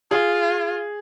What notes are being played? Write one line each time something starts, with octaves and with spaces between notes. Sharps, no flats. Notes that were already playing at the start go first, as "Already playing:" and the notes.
F4 G#4